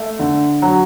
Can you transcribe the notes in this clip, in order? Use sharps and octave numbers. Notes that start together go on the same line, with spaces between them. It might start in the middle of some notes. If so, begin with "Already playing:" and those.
Already playing: A3
D3
F#3